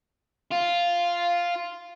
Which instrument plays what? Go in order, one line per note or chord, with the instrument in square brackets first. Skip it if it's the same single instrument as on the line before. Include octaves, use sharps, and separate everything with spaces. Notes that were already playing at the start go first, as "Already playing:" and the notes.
[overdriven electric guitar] F4